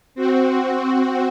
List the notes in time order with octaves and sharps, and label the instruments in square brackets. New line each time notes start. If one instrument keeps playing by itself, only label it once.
[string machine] C4 F#4